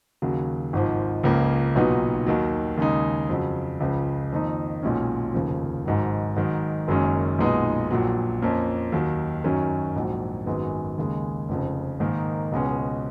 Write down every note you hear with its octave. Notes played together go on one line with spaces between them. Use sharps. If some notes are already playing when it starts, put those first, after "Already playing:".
D#2 C#3 F#3
G#1 G#2 F3
C#2 C#3 F3 A#3
B1 A#2 F#3 B3 D#4
D#2 D#3 F#3
D#2 C#3 G#3 D#4
F2 C#3 F#3
C#2 C#3 F3
F2 D#3 A#3 D#4
B1 A#2 G#3 C#4
F1 D#2 C#3 F3
G#1 G#2 F#3
G#2 D#3 F#3
F#1 F#2 D#3 G#3 C#4
B1 A#2 G#3 B3 D#4
A#1 A#2 F#3
F2 F3 A#3 C#4
D#2 D#3 F#3
F#2 D#3 F#3 C#4
A#1 G#2 F#3
G#1 F#2 D#3 G#3 B3
D#2 C#3 G#3
F1 F2 C#3
G#2 D#3 A#3 D#4
C#2 B2 G#3 C#4